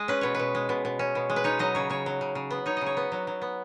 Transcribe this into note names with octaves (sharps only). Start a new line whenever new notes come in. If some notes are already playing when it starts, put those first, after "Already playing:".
Already playing: G#3 D#5
C#4 B4
B2 C#5
B2 B4
G#3
B2
B2
C#4
B2
G#3
B4
D#4 C#5
F#3 D#5
C#3 C#5
C#3 C#5
F#3
C#3
C#3
B3
D#4 C#5
C#3 D#5
C#5
B3
F#3
F#3
B3